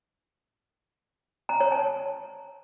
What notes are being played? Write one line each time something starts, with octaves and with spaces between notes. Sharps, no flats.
A#5
C#5
A5